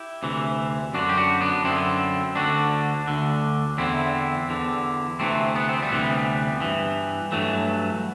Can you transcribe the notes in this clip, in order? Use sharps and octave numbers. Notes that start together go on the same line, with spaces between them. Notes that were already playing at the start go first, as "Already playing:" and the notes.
Already playing: E4 G4
D2 C3 E3
F#2 D3 D4 F#4
G4
D4 F#4
B3 D4
F#2 D3 C4 E4
D2 D3 D4 F#4
D2 D3
E2 D3 C4 E4
E2 D3
D2 C3 E3 A3 C4
B3
C4
G3 B3
D2 C3 E3
G2 E3
G2 E3 F#3 A3